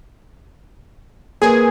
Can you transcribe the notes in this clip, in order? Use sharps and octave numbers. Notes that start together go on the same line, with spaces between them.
A#3 G#4 A#4 B4